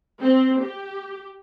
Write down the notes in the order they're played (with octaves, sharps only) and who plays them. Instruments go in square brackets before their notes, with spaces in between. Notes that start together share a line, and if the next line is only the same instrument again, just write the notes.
[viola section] C4
G4